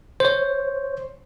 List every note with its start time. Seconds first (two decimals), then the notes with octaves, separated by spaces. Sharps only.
0.20 C5 C#5